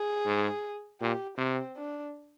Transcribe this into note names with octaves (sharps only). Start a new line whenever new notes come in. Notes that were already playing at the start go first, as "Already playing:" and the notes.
Already playing: G#4
G#2
A#2 G4
C3 C4
D4